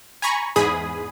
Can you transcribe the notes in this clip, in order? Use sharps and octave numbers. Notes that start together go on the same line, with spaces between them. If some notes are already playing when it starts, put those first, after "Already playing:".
G#5 A#5 B5 C#6
E2 G#2 G#4 B5 D#6